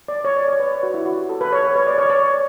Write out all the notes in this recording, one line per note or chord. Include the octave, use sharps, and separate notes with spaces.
D5
C#5
D5
C#5
B4
B4
F#4
E4
F#4
G4
A4
B4
C#5
B4
C#5
D5
C#5
D5
C#5